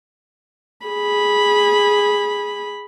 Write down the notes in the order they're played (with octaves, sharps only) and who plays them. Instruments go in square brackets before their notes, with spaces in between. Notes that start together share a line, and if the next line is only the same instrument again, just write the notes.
[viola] G#4 B5